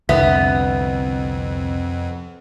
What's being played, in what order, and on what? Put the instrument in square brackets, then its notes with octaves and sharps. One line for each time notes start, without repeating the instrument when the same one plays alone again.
[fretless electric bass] C2 D3 [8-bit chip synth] F2 [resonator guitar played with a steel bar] B3 [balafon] E5